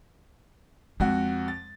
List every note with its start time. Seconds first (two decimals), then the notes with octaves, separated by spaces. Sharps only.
1.00 F2 G#3 F#4
1.48 A6